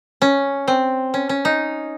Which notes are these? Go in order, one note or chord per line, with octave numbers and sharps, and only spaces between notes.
C#4
C4
C#4
C#4
D#4